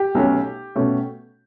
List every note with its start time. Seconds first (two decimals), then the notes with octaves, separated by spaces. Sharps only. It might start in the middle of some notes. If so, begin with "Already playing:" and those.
Already playing: G4
0.15 B1 B2 A3 C#4
0.76 B2 A3 C#4